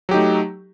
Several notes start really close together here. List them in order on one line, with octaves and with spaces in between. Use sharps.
F#3 G4 D#4 A3